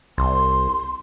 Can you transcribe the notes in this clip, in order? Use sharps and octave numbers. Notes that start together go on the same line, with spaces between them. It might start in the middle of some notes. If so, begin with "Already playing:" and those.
C2 C6